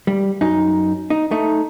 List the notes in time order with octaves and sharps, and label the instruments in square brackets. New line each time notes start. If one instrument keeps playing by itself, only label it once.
[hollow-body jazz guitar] G3
F#2 D#4
D#4
A3 D#4